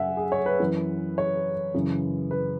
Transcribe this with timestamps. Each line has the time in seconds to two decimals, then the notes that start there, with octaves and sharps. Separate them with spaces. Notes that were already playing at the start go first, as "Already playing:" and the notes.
Already playing: F#2 F#3 E5 F#5 G#5
0.17 G#4
0.32 C#5
0.46 B4
0.60 F#2 E3
1.18 C#5
1.74 F#2 C#3 E3
2.31 B4